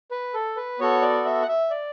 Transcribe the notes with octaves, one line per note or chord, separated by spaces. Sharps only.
B4
A4
B4
B3 F#4 A4 C#5
D5
E5
F#5
E5
D5